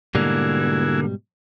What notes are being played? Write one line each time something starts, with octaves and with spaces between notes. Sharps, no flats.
G#2 B2 D3 G3 A#3 E4 F#4 G#5